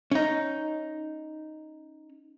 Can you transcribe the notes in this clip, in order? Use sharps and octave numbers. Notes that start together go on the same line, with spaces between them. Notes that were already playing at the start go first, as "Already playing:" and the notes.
C#4 D#4